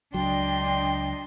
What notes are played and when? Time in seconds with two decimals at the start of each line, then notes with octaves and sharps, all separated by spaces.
0.14 C#2 F#3 D4 D#5 G5 C6